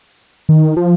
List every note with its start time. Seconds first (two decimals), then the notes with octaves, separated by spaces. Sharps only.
0.49 D#3
0.77 F3